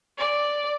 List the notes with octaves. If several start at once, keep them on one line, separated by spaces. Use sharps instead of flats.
D5